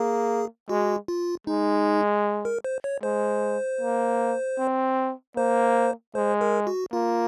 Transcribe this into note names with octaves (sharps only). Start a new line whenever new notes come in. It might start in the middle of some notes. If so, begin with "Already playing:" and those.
Already playing: A#3 G#4
G#3 F#4
F4
G#3 D#4
A#4
C5
C#5
G#3 C5
A#3
C4
A#3 C5
G#3 C5
A#4
F#4
A#3 F4